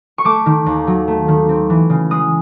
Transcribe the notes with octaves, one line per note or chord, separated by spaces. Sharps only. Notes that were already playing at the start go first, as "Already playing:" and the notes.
C#6
A3 D6
D#3
D#2
F#3
A3
D#3
C4
E3
C#3
G#3 D#6